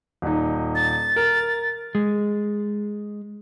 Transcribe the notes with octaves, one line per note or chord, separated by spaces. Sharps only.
D#1 D#4
A6
A#4
G#3